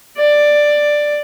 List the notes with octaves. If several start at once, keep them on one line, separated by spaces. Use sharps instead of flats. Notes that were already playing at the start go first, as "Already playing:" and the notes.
D5